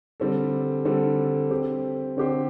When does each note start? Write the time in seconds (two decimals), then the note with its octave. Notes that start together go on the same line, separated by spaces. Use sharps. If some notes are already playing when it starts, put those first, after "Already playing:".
0.20 D3 G3 C4 A4
0.85 D3 G3 C4 A4
1.50 D3 C4 G4 C5
2.17 D3 C4 G4 C5